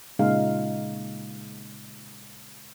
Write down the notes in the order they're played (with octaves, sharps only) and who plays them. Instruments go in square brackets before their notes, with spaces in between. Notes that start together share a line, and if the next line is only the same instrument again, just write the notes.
[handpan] A#2 C#3 G#3 D#4 F5